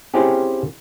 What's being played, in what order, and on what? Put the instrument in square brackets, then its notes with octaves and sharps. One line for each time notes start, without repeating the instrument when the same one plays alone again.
[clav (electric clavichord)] C4 C#4 E4 G4 G#4